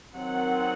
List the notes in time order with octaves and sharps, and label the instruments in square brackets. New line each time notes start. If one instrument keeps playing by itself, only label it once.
[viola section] D#3 F#3 C4 F#5